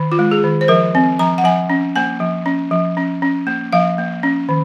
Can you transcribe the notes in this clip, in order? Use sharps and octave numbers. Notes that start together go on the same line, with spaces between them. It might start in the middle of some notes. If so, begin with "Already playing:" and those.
Already playing: D#3
F4
G#3
G#4
D#3
C5
F3 A#4
C4
F3 A#5
F#5
F3 G#5
C#4
A#3 G#5
F3
C#4
F3
C#4
C#4
A#3
F3 F5
A#3
C#4
D#3